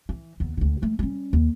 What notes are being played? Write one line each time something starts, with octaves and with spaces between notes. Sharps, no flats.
E3
D#2 B3
D2 D3
G3 A3
G3 C#4
D#2